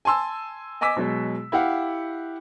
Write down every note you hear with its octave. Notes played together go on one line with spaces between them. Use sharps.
G#5 A5 C6 E6
D#5 G#5 D6 E6 B6
B2 F#3 G#3
E4 G4 F5 F#5